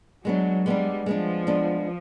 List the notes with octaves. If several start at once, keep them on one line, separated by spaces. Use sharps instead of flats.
F#3 G#3 B3 D4
G3 G#3 B3 D4
F3 G#3 B3 D4
G#3 B3 D4